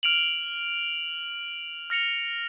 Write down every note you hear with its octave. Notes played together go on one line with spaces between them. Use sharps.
F6 D7 F7 F#7
F6 A#6 C#7 F7